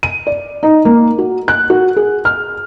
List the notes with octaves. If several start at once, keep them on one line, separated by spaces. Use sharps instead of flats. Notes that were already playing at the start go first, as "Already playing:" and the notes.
D#7
D5
D#4
A#3
F#4
F#6
F#4
G#4
F6